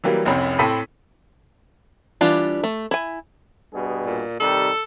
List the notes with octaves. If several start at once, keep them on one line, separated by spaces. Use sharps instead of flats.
E3 F#3 G3 A#3
F1 C2 F2 C4 C#4 B5
A2 C4 A4 B5 B6 D#7
E3 G3 D4 F4
A3
E4 G#5
G2 B2 G#4
A#2
C3 D#3 G3 A4